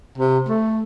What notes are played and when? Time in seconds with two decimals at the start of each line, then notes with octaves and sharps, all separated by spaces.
0.18 C3
0.48 A3